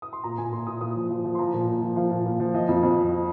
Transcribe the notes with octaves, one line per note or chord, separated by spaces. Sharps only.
D#6
C6
A#2 A#5
A#2 G#5
A#2 C6
A#2 D#6
A#2 D#6
F3
F3
F3
C6
F3 A#5
A#2
A#2
F3
F3 F5
A#2
A#2
F3
F3 D#5
F2
F2
F3